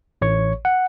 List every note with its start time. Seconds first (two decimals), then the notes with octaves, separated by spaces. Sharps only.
0.22 A1 C#5 C#6
0.65 F#5